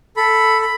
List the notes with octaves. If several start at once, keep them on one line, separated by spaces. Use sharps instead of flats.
A4 B5
B5